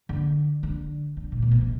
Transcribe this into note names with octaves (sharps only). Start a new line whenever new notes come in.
D3
D3
D3
A2
A#2
B2
C3